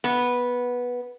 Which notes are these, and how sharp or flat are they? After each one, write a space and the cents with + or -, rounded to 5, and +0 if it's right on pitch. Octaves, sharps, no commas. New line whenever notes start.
B3 -10